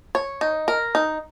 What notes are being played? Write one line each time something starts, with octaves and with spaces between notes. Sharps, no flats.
C#5
D#4
A#4
D#4